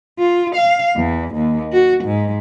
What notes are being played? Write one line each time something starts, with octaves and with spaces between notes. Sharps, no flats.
F4
F5
E2
D#2
F#4
G#2